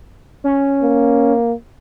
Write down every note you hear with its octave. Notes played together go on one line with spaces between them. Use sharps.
C#4
A#3